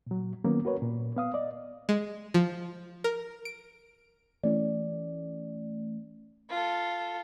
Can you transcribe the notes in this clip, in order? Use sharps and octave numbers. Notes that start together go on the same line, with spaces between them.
A#2 F#3
D#3 F#3 A#3 B3 C#4
F#4 A#4 B4 C#5
A#2
B3 F5 D#6
D5 D#5
G#3
F3
A#4
D7
E3 A3 C#4 D5
F4 A4